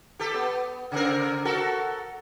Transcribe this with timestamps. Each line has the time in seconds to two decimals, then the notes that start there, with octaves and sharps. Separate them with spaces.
0.19 G4 A4
0.34 B3
0.92 C#3 C4 A#4
1.45 F#4 A4 A#4